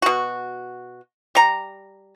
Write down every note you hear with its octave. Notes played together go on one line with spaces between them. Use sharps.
B2 F#4
G3 A#5